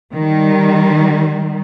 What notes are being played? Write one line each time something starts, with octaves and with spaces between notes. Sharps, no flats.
D#3 G3